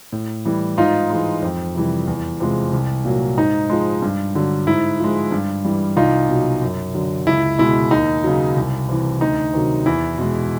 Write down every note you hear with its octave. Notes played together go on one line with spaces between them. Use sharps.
A2
E3 G3
G#2 D#4 F4
E3 G#3
F2
C3 E3 G3
E2
C3 F3 G#3
C2
A#2 F#3
G#2 D#4
F3 G#3
G2
D3 F#3
G#2 E4
F3 G#3
G2
E3 G3
C2 D#4 F4
B2 F#3
F#2
D3 F#3
C#2 E4
B2 G#3 E4
D#2 D#4
C#3 F#3
C2
C3 E3
D2 D#4
C3 D#3 F#3
E2 E4
B2 G#3